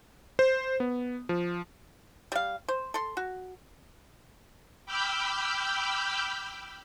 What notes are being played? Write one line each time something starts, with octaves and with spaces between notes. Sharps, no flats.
C5
B3
F3
G3 F5
C5
A4 C6
F#4
G5 B5 D6 E6 F6 G6